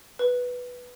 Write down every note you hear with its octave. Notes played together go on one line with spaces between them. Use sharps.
B4